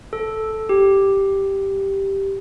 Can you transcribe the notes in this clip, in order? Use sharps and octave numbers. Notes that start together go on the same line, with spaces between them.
A4
G4